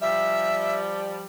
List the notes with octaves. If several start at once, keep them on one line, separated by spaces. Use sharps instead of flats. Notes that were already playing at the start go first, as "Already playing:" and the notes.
F3 G3 E5